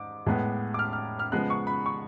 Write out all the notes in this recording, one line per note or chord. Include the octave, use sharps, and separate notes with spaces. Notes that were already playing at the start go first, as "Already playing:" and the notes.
Already playing: G#2 D6
A2 G#3 B3
D6
F6
F6
F6
C#3 F3 G#3 B3 F#6
C#6
B5
C#6